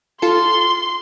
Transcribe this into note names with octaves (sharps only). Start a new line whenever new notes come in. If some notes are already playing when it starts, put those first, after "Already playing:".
F4 A4 C6